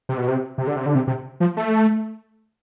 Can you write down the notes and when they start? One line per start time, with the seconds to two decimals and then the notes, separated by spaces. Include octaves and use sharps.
0.09 C3
0.18 B2
0.28 C3
0.58 C3
0.67 D3
0.76 C3
0.86 D3
0.95 C3
1.07 C3
1.40 F3
1.57 A3